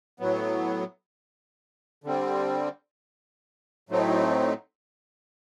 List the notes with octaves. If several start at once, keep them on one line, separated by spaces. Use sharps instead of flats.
A2 F#3 B3
D3 G3 C4
A2 F#3 A3 C4 D#4